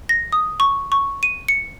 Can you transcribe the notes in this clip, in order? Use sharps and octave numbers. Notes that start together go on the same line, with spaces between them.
A#6
D#6
C#6
C#6
D#7
C#7